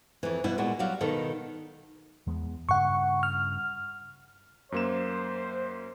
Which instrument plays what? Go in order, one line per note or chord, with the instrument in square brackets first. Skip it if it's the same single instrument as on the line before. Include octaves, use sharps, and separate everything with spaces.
[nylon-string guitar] F2 E3
G2 B2 E4
A#2 G#3 B3 F#4
F#3 G3 F#4 G4 F5
B2 D#3 A4
[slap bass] E2 G#3 B3
[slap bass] G2 C#3 [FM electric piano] F#5 C#6
[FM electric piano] F6
[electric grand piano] F#2 A#3 E7 [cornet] C5